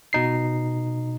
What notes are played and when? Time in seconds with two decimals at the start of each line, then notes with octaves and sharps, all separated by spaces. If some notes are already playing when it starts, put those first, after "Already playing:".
0.13 B2 D#4 C7